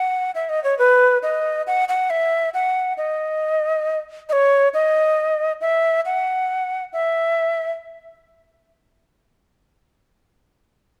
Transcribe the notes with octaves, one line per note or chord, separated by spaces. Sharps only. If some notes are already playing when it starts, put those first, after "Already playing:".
Already playing: F#5
E5
D#5
C#5
B4
D#5
F#5
F#5
E5
F#5
D#5
D#5
C#5
D#5
E5
F#5
E5